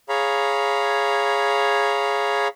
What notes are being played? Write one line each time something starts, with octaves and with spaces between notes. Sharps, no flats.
G#4 C#5 F5 A#5 B5